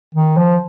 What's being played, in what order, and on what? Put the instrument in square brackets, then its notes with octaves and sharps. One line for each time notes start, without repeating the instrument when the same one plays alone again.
[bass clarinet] D#3
F3